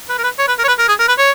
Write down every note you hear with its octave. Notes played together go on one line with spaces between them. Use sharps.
B4
A#4
B4
C#5
B4
A#4
C#5
B4
A#4
G#4
A#4
B4
C#5